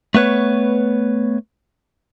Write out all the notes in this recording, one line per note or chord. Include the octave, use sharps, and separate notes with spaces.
A3 B3 B4 C#5